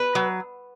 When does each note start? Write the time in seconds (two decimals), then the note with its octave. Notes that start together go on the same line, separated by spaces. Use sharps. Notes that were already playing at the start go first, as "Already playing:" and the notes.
Already playing: B4
0.15 F#3